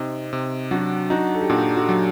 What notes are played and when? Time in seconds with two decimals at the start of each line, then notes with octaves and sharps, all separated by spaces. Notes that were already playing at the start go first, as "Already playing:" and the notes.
Already playing: C3 C4 D#4
0.33 C3
0.71 F#3 D4 F#4
1.10 D4 D#4 F#4
1.34 A4
1.41 G4
1.50 A#2 D4 F#4
1.75 F#4 A4
1.89 F#3